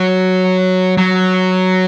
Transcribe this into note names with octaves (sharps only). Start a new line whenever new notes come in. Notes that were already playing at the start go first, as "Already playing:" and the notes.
Already playing: F#3
F#3